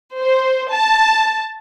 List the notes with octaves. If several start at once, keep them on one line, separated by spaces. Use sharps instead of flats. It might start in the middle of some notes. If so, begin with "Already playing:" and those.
C5
A5